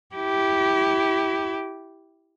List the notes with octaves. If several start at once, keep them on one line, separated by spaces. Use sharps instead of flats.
E4 G4